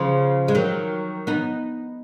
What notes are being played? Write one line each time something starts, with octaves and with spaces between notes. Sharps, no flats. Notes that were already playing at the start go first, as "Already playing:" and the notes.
Already playing: C#3 F3
G#3
D#3 F#3
B3 D#4